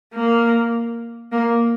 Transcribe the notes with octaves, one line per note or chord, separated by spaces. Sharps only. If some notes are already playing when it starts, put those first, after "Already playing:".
A#3
A#3